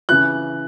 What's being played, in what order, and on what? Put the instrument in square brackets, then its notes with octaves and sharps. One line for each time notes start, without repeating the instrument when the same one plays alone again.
[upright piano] C#3 E3 F#6